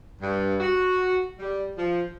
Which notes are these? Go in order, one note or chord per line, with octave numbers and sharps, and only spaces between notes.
G2
F#4
G3
F3